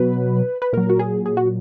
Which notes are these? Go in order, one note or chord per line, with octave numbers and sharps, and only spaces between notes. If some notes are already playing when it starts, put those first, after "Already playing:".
Already playing: B2 F#3 B4
B4
A#2 F#3 A#4
F#4
G#4
G#4
F#4